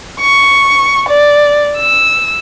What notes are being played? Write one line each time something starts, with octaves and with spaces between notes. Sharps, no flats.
C#6
D5
E6